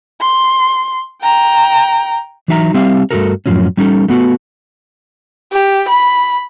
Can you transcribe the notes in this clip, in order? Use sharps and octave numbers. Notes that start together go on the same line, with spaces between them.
C6
G5 A#5
E3 F#3 D#4 E5 F5 A#5
G3 C4 G4 E5 F5
G2 G#3 A3 F#4 A4 A#4
F#2 A2 F3 F#3 C#4
G3 C#4 D#4 A4
A3 B3 F#4
G4
B5